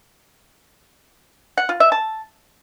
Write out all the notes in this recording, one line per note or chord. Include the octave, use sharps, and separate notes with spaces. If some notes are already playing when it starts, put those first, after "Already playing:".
F#5
F4
E5
A5